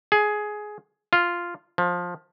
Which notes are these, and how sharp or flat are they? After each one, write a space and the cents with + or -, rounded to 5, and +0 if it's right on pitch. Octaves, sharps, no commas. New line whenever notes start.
G#4 +15
F4 -5
F3 +15